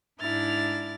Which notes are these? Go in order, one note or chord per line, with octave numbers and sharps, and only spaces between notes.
G#2 D4 E4 F6 A6